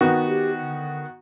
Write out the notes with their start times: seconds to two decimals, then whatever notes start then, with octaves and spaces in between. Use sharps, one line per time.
0.01 D#3 B3 F#4
0.27 G4
0.61 D3